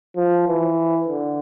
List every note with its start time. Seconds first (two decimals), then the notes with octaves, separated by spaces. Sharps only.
0.16 F3
0.47 E3
1.08 D3